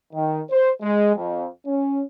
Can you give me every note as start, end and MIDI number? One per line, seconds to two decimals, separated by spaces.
0.14 0.40 51
0.51 0.72 72
0.82 1.15 56
1.16 1.46 41
1.66 2.01 61